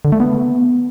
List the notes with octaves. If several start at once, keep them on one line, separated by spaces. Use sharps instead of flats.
D3
A3
B3